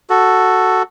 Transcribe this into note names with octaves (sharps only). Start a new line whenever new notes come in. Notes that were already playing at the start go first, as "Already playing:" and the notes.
F#4 A4